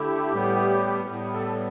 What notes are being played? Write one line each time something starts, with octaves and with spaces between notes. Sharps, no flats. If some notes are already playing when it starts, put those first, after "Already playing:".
Already playing: D3 A3 E4 G4
A2 G3 B3
A2 G3 B3
A4